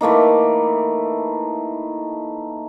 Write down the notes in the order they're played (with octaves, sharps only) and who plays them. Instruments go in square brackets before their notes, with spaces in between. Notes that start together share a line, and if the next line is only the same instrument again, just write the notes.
[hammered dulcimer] E3 A3 A#3 D#4